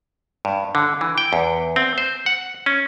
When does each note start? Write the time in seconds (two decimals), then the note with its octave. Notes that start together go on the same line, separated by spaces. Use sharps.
0.45 G2
0.75 D3
1.01 E3
1.18 G5
1.33 E2
1.76 C4
1.98 C5
2.26 F#5
2.66 C#4